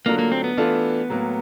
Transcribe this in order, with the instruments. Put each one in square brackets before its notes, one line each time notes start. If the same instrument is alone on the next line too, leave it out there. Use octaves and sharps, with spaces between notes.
[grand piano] D3 F#3 A3 D4 F4 [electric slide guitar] A#3
[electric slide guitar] A#3
C4
B3
[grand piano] E3 A3 D4 F4 A4
A2 F#3 A#3